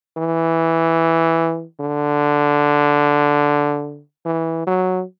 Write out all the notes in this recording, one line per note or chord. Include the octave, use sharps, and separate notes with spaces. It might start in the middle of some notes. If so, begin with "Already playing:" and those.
E3
D3
E3
F#3